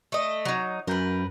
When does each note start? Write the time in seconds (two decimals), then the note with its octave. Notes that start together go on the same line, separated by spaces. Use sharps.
0.12 A3 D#5
0.45 F#3 D#4
0.87 F#2 A#4 B4 G6